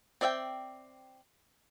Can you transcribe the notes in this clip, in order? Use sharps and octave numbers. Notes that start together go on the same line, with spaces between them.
C4 D5 E5 F5 G5